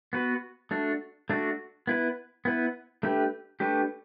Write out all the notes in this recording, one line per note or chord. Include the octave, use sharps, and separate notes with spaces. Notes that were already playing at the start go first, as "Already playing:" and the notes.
B3 F#4 B4
A3 D4 F#4
A3 D4 F#4
B3 E4 B4
B3 E4 B4
A3 D4 G4 B4
A3 D4 G4 B4